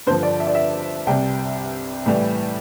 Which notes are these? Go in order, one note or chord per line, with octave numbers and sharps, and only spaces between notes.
G2 D3 F3 C5
D5
E5
D5
E5
C2 C3 G3 G5
A2 E3 G3